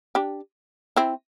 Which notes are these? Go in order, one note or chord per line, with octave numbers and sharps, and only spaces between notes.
D4 G4
C4 E4